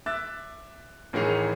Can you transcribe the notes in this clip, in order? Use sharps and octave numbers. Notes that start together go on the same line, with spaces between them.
E5 D6 E6 F#6 A6
A1 D#3 E3 G#4 C#7 F7